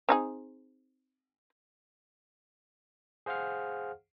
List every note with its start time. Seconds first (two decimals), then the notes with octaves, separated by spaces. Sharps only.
0.09 C4 D#4 G#4
3.26 G#4 C5 F5 F#5 F6